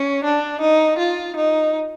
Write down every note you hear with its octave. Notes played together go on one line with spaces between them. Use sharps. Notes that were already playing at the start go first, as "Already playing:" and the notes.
Already playing: C#4
D4
D#4
F4
D#4